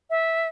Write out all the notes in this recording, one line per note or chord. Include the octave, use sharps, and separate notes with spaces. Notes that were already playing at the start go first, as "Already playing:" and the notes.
E5